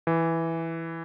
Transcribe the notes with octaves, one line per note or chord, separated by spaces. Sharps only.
E3